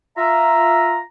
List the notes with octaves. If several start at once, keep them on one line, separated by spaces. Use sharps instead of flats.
F4 E5 A#5